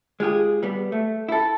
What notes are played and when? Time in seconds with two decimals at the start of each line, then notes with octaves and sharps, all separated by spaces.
0.20 G#3 F4 G4 G#4
0.63 G3 B3
0.92 A3
1.29 E4 A4